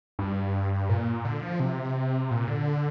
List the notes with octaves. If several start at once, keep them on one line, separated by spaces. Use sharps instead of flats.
G2
A#2
D3
F3
C3
A#2
D3